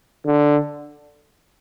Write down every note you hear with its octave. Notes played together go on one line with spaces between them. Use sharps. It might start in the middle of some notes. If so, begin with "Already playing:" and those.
D3